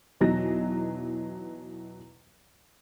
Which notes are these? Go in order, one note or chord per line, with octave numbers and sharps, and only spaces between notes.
E2 B2 E3 F#3 D#4 A#6